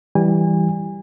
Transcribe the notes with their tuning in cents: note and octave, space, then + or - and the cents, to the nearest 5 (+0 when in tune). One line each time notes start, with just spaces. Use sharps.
E3 +0 G3 +0 G#5 -30